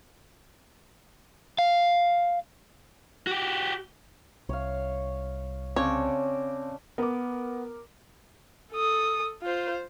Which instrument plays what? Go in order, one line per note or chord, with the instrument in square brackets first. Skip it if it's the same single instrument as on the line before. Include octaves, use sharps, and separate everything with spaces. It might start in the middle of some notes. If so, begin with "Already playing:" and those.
[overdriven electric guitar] F5
[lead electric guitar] F#4 G4
[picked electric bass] C2 [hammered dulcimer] C#5 F5
[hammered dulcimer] C#3 D5 A5 [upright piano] C4 [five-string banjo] C#5
[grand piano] B3 [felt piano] A#4 D6
[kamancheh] A4 D#6
F4 C5